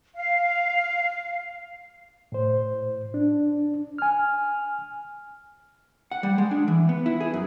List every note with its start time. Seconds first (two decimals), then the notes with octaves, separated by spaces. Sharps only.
0.16 F5
2.32 A2 C5
3.14 D4
3.98 G#5 F6
6.11 F#5
6.23 G3
6.38 G#3
6.51 D4
6.68 E3
6.89 B3
7.06 E4
7.20 G#4
7.34 F#2